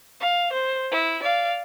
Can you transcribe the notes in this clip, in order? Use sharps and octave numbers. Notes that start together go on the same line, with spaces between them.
F5
C5
E4
D5 F5